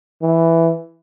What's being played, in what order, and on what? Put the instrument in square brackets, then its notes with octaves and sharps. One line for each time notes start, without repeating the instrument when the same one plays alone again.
[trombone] E3